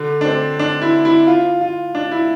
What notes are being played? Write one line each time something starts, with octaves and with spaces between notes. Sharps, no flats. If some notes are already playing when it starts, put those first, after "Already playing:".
Already playing: D3
D4
C4
D4
E4
E4
F4
F4
D4
E4